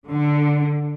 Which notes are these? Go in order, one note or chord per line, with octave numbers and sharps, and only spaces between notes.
D3